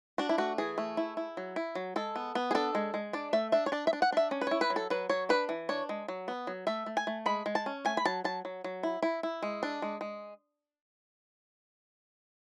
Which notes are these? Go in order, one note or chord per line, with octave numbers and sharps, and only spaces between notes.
D4 F#4
E4
A3 F#4
E3 G#4
A3
E4
E4
F#3
E4
F#3
G#3 A4
B3
B3
G#4
D4 A4
G#3
G#3
D4 D5
A3 E5
D4 E5
C#5
D4 D5
E5
D4
F#5
D4 E5
C#4
B4
E4 C#5
B4
F#3
A4
F#3 B4
F#3 C#5
D4 B4
E3
D4 C#5
G#3
F#3
B3
F#3
A3 E5
A3
G#5
A3
G#3 B5
G#3
A5
C#4
A3 G#5
B5
F#3 A5
F#3 A5
F#3
F#3
E4
E4
E4
G#3
D4
G#3
G#3